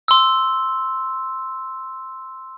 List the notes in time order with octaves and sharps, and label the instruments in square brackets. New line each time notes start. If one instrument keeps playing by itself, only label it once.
[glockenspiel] C6 E6